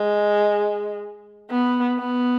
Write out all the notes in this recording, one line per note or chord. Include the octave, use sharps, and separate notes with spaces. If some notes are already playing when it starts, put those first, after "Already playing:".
Already playing: G#3
B3
B3